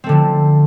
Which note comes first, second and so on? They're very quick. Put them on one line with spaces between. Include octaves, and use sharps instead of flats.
C4 A3 D3 F3